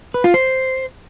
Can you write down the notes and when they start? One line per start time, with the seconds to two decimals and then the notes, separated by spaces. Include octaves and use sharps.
0.14 B4
0.24 F4
0.34 C5